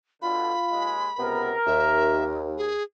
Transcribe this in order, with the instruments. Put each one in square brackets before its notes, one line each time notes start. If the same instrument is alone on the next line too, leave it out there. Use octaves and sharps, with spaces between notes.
[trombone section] B2 D3 [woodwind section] F4 [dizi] B5
[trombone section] D#2 G#3
[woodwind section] C#2 C3 B3 [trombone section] A#4
[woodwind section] D#2 [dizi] E5
[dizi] G#4